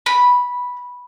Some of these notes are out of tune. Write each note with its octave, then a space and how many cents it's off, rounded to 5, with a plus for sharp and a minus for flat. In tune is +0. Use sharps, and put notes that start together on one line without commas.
B5 -5